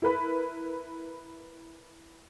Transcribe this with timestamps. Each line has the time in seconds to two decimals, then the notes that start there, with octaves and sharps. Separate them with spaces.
0.02 E4 A#4 B4 B5